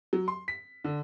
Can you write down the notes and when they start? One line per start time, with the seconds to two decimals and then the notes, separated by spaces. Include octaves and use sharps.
0.13 F#3
0.28 C6
0.48 B6
0.84 D3